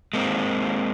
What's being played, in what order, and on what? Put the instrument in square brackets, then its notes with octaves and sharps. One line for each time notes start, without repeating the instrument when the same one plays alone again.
[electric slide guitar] G#3 A#3 C4